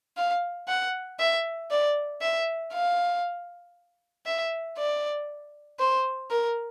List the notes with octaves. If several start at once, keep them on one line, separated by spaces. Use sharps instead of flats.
F5
F#5
E5
D5
E5
F5
E5
D5
C5
A#4